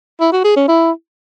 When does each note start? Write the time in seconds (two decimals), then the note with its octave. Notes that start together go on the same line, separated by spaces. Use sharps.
0.20 E4
0.32 F#4
0.44 G#4
0.56 C#4
0.68 E4